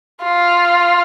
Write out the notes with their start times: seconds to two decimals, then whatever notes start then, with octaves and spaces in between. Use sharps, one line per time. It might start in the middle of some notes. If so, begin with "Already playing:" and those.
0.24 F4